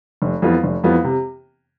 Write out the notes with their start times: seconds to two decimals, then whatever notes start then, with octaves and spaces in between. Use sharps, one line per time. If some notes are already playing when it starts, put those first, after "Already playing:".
0.22 F1
0.42 F2 E3 B3 F4
0.64 F1
0.84 F2 E3 B3 F4
1.04 C3